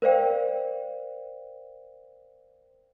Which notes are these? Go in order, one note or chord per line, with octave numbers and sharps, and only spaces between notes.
A#4 C5 D5 F5 G5